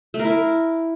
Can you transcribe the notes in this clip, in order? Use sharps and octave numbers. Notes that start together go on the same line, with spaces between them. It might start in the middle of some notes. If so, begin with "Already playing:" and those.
A3
A#4
E4
A#4